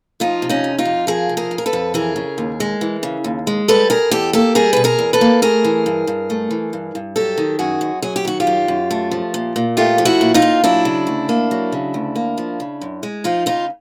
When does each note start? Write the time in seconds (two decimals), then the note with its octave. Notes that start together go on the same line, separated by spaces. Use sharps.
0.20 F3 D#4 F4
0.42 C3
0.49 C#4 D#4
0.64 F2
0.78 D#4 F4
0.85 F2
1.07 F3 G#4 A#4
1.29 C3
1.37 G#4 A#4
1.51 F2
1.58 A#4
1.66 A4 B4
1.73 F2
1.94 E3 G#4 A#4
2.16 C#3
2.38 D#2
2.60 G#3
2.81 E3
3.03 C#3
3.24 D#2
3.47 G#3
3.68 G3 A4 B4
3.90 B2 G#4 A#4
4.11 E2 G4 A4
4.33 A#3 G4 A4
4.55 G3 G#4 A#4
4.73 B2 B4
4.84 G#4 A#4
4.99 E2
5.13 A4 B4
5.21 A#3
5.42 A3 G#4 A#4
5.64 E3
5.86 G2
6.07 G2
6.30 A3
6.51 E3
6.73 G2
6.95 G2
7.16 F#3 G4 A4
7.38 D#3
7.59 F#2 F#4 G#4
7.81 F#2
8.02 F#3 G#4
8.16 G4
8.25 D#3 F#4
8.40 F4 G4
8.47 F#2
8.68 F#2
8.91 A3
9.11 F3
9.34 A#2
9.56 A#2
9.77 A3 F4 G4
9.98 F3
10.05 E4 F#4
10.21 A#2
10.34 D#4 F4
10.42 A#2
10.64 F#3 D4 E4
10.85 C#3
11.07 D2
11.29 A#3
11.51 F#3
11.72 C#3
11.94 D2
12.16 A#3
12.38 F3
12.60 C#3
12.81 F#2
13.03 G#3
13.24 F3 D#4 F4
13.46 C#3 D#4 F4